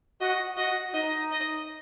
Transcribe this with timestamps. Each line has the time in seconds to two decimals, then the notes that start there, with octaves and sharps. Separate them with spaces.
0.21 F#4 D#5
0.57 F#4 D#5
0.94 D#4 D#5
1.31 D#5